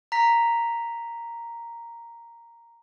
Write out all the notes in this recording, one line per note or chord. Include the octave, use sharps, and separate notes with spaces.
A#5 B6